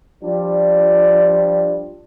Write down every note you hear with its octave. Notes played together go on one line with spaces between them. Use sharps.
F3 G3 D4 F4